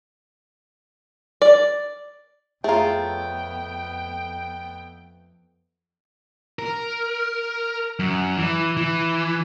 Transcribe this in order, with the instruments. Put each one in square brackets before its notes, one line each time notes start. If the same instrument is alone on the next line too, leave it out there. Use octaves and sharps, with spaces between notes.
[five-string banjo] D5
[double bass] F2 B3 [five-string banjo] A3 F4 [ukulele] G#4 C#5 A#5 [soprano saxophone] G5
[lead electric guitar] A#4
F#2
E3
E3